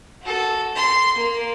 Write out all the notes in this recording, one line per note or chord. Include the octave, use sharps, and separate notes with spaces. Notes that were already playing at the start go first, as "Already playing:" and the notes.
F#4 A4
C6
A#3